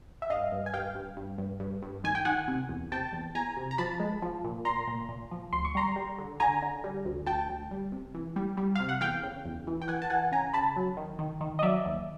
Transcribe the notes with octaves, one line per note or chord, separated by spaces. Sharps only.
E5
G2 D#5 F5
G2
G#5
G2 F5 G5
G2
G2
G2
G2
G2
D#3 G#5
G5
D#3 F#5 G#5
C3
E2
C3 G5 A5
E2
E2 G#5 A#5
C3
A#5
F3 A5 B5
G#3
F3
A#2
A#2 A#5 C6
A#2
A#2
F3
D2 C6
C#6
G3 A#5 C6
G3
D3
D3 G#5 A#5
D3
G3
D2
D2 G5 A5
D2
G3
C3
E3
G3
G3
C3 F5
F#5
E2 F5 G5
C#3
E2
E3
G5
E3 F#5 G#5
A5
E3 F#5 G#5
C#3 G#5 A#5
C#3 A5 B5
F#3
D#3
D#3
D#3
D#5
F#3 D5 E5
D#2